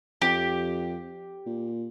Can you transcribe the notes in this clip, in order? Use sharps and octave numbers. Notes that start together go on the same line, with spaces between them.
F2 G4
A#2